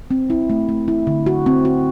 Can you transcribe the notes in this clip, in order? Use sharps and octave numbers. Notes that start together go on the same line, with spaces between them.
C4
E4
A3
A3
E4
D3
F#4
C4
F#4